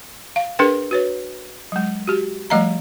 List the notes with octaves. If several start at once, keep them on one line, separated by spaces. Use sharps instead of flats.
F5
D4 G#4 A#4 B4 G5
F#4 B4 C#5
F#3 G#3
F#4 G4
F3 G3 A3 D#5 F5 A#5